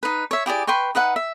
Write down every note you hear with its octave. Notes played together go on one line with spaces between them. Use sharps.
D#4 B4
C#5 E5
E4 G4 G#4 D5
B4 G5 C6 C#6
D#4 B4 E5 F#5
E5